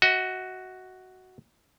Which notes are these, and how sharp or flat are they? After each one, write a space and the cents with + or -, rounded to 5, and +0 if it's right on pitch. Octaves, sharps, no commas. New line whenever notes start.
F#4 +5 D#5 +45